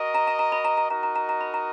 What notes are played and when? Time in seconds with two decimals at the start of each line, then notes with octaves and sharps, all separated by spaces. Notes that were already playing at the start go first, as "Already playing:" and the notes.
Already playing: F#4 A#4 D#5
0.14 A#5
0.27 A#5
0.39 A#5
0.52 B5
0.64 A#5
0.77 A#5
0.90 D#4 F#4 A#4 D#5 A#5
1.03 A#5
1.16 A#5
1.29 A#5
1.41 B5
1.54 A#5